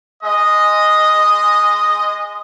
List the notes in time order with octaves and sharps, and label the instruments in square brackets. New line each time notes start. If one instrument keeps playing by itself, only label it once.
[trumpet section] G#3 D#5